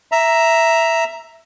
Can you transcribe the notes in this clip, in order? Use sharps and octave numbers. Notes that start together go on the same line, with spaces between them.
E5 A#5